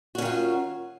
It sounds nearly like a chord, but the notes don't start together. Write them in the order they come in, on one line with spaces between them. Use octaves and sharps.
F#4 C#4 D#3 F4